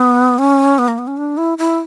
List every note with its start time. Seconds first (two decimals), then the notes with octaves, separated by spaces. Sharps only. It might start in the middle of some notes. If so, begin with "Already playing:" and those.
Already playing: B3
0.39 C#4
0.79 B3
0.88 A#3
0.98 B3
1.07 C#4
1.17 D4
1.37 E4
1.58 E4